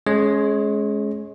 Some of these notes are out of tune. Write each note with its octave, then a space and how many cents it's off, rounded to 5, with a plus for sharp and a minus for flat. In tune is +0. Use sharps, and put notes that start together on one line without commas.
G#3 +20 C#4 +0 C#5 -20